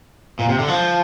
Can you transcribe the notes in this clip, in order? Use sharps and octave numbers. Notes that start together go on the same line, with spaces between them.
A#2
C3
D3
F3